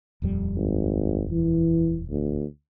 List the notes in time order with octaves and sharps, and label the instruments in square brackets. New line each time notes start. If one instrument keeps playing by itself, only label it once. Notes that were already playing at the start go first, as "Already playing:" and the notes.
[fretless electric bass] D#1 F2 G3
[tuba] G#1
E3
D2